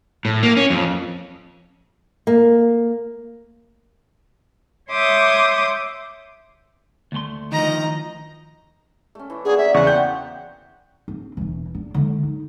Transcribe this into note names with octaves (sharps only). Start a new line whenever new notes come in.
A2
A#3
C#4
F2
A#3
C#5 E5 C6 D6 D#6 G6
D2 A3 C6
D#3 F3 D#5 A#5
A3 C#4
E3
D3 F#3 A#3 G#4
E5
E2 C#3 F#5 C#6
C5 G5 G6
C4
E1 E3
D4
D3 G#3
D#4